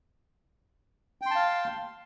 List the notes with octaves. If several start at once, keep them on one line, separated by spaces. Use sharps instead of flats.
F5 G5 A5 C6